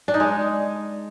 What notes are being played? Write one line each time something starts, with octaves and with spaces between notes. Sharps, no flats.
D4
D#4
G#3